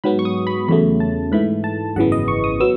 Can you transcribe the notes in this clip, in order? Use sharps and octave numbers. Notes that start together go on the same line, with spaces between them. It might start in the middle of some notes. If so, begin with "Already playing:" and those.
G#2 F#3 B3 B5
C#6
D#6
B5
E2 C#3 F#3 A3 B5
A5
G#2 E3 A3 B5
A5
G#1 F#2 C#3 E3 B3 F#5
D#5
C#6
D#6
F#3 B3 E6